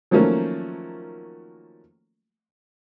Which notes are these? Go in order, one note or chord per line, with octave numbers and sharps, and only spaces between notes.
D#3 F3 F#3 A3 A#3 C#4